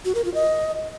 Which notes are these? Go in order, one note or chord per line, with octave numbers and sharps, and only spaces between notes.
F#4
A#4
F4
D#5